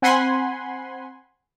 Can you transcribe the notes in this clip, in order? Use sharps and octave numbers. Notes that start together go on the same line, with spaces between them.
C4 F#5 G#5 B5 C6